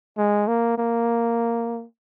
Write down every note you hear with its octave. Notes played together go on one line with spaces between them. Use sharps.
G#3
A#3
A#3